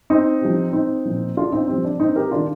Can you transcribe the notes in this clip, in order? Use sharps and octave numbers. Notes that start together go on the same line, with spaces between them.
C4 D#4
C3 F3
C4 D#4
A#2 F3
D4 F4
C4 D#4
C3 F3 C4
D4
C4 D#4
G4 A#4
C3 D#3 D4 F4